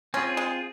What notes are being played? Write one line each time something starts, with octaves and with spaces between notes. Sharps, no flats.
C4 C#4 F4 G#4
G#3